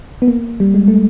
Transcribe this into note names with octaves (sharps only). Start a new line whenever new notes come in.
B3
A#3
G3
G#3
A3